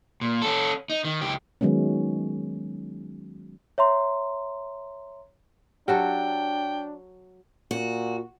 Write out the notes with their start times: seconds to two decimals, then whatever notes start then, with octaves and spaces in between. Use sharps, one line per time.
0.21 A#2
0.42 C#4 A4
0.90 D#4
1.05 D#3
1.21 C#2 G4
1.61 D#3 F#3 G#3 B3 C#4
3.78 C#5 E5 A#5 C6
5.88 F#3 D4 F#4 G4 A4 G5
7.71 A#2 F#4